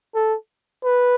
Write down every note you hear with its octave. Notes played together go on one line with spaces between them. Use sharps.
A4
B4